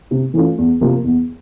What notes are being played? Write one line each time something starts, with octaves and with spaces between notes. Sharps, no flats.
C3
E3 A3 C#4 F4
E2
C3 F3 A#3
E2